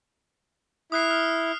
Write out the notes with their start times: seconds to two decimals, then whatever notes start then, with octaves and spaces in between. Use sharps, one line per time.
0.92 E4 D#6 F#6 C7
1.11 F6